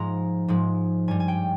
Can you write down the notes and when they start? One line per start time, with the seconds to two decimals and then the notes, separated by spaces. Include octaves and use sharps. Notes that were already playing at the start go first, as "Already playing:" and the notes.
Already playing: G#2 F3 G#3 A#5
0.48 G#2 F3 G#3
1.08 G2 G3 G#5
1.20 G#5
1.28 G5